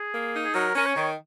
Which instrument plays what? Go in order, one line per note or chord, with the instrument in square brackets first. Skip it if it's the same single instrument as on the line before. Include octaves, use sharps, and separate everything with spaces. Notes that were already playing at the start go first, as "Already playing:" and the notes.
Already playing: [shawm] G#4
[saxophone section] A#3
D#4
[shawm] G#4
[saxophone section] F#3 [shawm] A#4
[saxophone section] C#4 [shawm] A#4
[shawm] C#5
[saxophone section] D#3